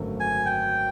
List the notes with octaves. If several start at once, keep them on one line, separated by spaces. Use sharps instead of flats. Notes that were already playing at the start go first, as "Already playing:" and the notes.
Already playing: G#1 F#2 D3 F#3 A3
G#5
G5